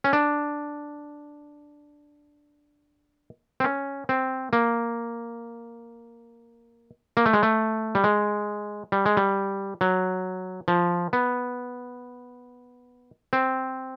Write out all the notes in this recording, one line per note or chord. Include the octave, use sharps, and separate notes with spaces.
C#4
D4
C4
C#4
C4
A#3
A#3
A3
G#3
A3
G3
G#3
G3
G#3
G3
F#3
F3
B3
C4